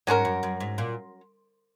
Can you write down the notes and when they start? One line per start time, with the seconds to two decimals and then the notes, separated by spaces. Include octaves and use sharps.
0.07 G#2 F#3 C#4 F#4 A#4
0.25 F#2
0.43 F#2
0.60 G#2
0.78 A#2